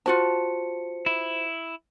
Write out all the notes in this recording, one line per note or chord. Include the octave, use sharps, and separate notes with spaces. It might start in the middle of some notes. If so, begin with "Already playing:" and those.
F4 F#4 C5 A5 C#7
E4